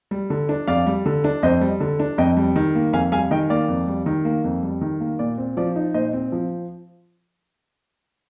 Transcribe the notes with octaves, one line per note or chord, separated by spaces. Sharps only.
G3
D3
D4
F2 D5 F5
G3
D3
D4
F2 C5 D#5
G3
D3
D4
F2 D#5 G5
G3
D#3
A#3
F2 F5 G#5
G3 F5 G#5
D#3 D#5 G5
A#3 D5 F5
F2
G3
D#3
A#3
F2
G3
D#3
A#3
A#2 D5
C4
F3 D5
D#4
A#2 C5 D#5
C4
F3